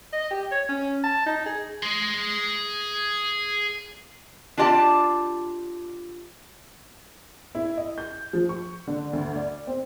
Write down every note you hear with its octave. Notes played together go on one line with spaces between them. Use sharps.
D#5
G4
C#5
C#4
A5
D#4
G#4
G#4 C6
D4 F4 G4 D5 A5
E4
D#5
G6
F3
C#6
D3
D2
D5
C4